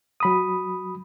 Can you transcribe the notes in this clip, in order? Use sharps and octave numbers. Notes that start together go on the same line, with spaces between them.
F#3 B5 D#6